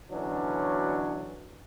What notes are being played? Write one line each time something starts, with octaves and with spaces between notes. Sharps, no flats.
B2 D3 E3 F#3 C#4 D4